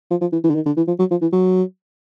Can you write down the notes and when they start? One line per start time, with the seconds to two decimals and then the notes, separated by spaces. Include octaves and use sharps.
0.10 F3
0.21 F3
0.33 E3
0.44 E3
0.50 D3
0.55 D#3
0.66 D3
0.77 E3
0.88 F3
0.99 F#3
1.11 F3
1.22 E3
1.32 F#3